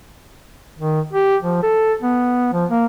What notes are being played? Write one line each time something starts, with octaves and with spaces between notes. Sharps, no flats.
D#3
G4
F3
A4
B3
F3
A#3